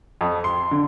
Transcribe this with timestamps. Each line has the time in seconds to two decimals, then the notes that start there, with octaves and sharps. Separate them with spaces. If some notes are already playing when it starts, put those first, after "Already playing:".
0.21 F2
0.44 C6
0.71 D3